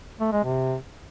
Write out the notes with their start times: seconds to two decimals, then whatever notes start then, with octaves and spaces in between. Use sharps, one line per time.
0.20 A3
0.32 G#3
0.44 C3